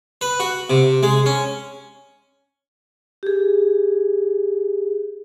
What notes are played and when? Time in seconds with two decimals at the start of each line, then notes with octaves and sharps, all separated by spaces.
0.21 B4
0.40 F#4
0.70 C3
1.03 G#3
1.26 C#4
3.23 G4 G#4